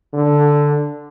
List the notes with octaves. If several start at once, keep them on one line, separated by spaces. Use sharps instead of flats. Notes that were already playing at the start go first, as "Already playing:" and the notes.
D3